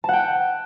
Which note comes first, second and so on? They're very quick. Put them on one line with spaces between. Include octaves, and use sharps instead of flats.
A5 F#5 G5